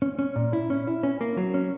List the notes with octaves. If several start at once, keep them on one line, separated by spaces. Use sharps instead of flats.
C#4
C#4
A#2
E4
C#4
E4
C#4
A#3
F#3
C#4